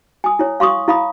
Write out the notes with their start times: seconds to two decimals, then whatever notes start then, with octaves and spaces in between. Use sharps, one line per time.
0.24 G#5 D#6
0.39 E4 C#5
0.60 F5 C6 C#6 D#6
0.88 E4 F5 B5 D#6